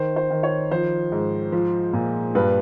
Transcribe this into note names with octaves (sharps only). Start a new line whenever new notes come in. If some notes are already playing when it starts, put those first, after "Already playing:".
Already playing: D#3 C5
C5
D#3
C#5
F3 C5
G#2
F3
A#2
G2 B4